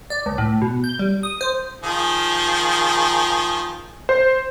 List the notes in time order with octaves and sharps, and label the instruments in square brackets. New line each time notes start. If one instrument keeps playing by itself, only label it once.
[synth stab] D5
C#2
A2
B2
G6
G3
D#6
C5
[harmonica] D#3 F3 G#4
[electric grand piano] C5